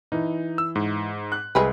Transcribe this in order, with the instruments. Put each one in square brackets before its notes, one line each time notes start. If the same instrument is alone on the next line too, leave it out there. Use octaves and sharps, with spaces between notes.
[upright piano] E3 [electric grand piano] D#4
[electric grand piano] E6
G#2
[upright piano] F#6
[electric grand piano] C2 [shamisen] G#3 G#4 B4